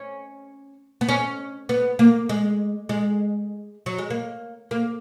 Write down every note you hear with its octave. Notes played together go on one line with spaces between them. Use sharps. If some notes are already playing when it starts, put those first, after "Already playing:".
Already playing: C#4
B3
C#4
B3
A#3
G#3
G#3
F#3
G#3
A#3
A#3